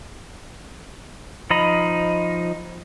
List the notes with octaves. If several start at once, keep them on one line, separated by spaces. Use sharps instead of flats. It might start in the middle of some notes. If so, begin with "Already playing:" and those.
F3 D#4 D#5 B5